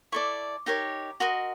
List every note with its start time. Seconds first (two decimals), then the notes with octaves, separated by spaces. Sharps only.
0.12 E4 A4 D5 C#6
0.66 D#4 G4 A#4 C#5
1.20 F#4 A#4 D#5 C6